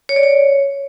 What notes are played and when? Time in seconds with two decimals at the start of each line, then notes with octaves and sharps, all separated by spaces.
0.09 C#5
0.16 D5
0.23 C#5